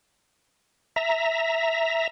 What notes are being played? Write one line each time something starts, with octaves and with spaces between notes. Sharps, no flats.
E5 A#5